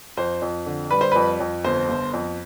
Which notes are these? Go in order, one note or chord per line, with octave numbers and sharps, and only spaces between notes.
F2 C5
F2
D3
G3 B4
C5
F2 B4
F2
G1 C5
G1
F2